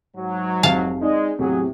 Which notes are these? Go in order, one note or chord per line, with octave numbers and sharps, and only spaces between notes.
G#2 F#3
F1 F5 A5
G#3 D#4 D5
E2 A2 C3 F#3 G#4